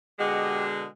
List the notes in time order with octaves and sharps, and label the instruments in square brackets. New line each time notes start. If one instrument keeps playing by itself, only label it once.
[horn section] B2 D3 G#3 [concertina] G4 D#5 F#5